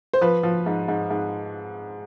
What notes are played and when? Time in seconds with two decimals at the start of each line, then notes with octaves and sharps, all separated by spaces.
0.13 C5
0.21 F3 B4
0.43 F3
0.66 G#2
0.88 G#2
1.10 G#2